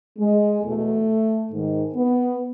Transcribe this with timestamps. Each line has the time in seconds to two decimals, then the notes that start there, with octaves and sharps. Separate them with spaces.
0.19 G#3
0.63 E2 B2 A3
1.51 G#2 D#3
1.95 B3